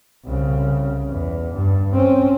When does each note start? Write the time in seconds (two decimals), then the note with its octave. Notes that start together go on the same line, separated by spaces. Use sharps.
0.25 C2 C#3
1.09 E2
1.54 G2
1.93 C4 C#4